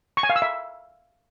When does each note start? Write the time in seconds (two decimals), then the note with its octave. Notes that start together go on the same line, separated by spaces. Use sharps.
0.17 C#6
0.23 G#5
0.30 F5
0.36 E6
0.42 E5